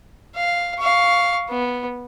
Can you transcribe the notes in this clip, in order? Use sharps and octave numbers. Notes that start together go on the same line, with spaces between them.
F5
F5 C#6
B3